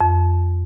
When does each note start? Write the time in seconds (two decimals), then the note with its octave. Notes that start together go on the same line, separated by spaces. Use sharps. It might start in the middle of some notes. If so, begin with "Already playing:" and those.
0.01 F2